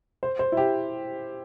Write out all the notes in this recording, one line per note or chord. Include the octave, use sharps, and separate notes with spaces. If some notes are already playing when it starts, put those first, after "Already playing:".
C5
C5
E4
G4